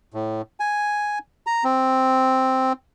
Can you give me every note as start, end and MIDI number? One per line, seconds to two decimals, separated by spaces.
0.14 0.42 45
0.60 1.19 80
1.47 1.64 82
1.64 2.73 60